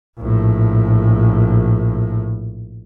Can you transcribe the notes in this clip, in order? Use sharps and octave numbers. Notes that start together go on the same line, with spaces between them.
A#1 A2